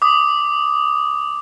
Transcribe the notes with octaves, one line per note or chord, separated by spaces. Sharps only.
D6 D#6